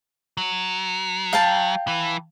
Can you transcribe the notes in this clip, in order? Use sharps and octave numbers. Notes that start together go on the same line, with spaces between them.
F#3
F5 G5 A5
E3